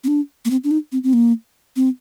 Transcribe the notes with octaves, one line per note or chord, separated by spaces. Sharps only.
C4
D4
A#3
C4
D4
D#4
C4
C4
A#3
C4